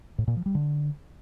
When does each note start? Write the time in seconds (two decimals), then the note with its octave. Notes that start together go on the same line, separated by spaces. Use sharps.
0.18 A2
0.27 A#2
0.37 F3
0.46 G3
0.55 D3